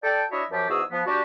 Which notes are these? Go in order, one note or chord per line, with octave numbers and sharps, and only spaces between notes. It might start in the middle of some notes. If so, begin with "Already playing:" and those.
A4 D5 G5
D4 E4 F#4 C#5 D#5 E5
F#2 F3 G4
E2 G#2 F#4 G#4 D#6 E6
F3 B3
G3 D4 F#4 G4